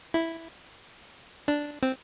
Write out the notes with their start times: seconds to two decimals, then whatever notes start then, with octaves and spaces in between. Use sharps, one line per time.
0.14 E4
1.48 D4
1.83 C4